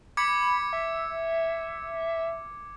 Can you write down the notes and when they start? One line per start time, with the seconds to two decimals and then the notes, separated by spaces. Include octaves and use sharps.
0.17 B5 D6 G#6 C#7
0.73 E5